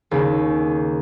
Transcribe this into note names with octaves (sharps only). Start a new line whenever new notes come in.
D#2 C#3